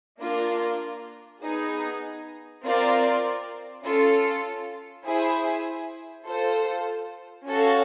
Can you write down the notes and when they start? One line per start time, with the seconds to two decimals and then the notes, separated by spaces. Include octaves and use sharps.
0.19 A#3 D4 F4 A#4
1.41 B3 D#4 G#4
2.63 C4 F4 A#4 D5
3.84 C#4 F4 A4
5.04 E4 G#4 C5 E5
6.27 F4 A4 C5
7.47 C#4 F#4 A4 C#5 F5